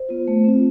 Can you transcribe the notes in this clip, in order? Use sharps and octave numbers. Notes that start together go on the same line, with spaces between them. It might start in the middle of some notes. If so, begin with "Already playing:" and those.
Already playing: C5
B3 F4
A3
C4 F4